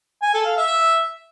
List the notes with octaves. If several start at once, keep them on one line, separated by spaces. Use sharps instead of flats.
G#5
A4
F5
E5